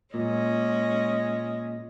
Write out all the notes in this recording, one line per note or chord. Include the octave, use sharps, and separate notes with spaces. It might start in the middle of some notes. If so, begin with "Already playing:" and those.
A#2 G#3 C#4 D#5